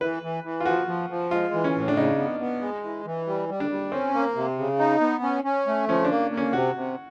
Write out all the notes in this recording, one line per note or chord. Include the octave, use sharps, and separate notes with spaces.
E3 B4
E3
E3
F4
F3 F#4
F3
F3
G#3 F4
E3
C#4
A2
D4
C#3 D#4
B3
B3
G#3
E3
E3
G3
G3
D4
G3
C4 C#4
A#3
C3
C#3
D#4
B3
C#4
C#4
A3
F3 C#4
D4
A#3
A#3
C#4
C3 F#4
C3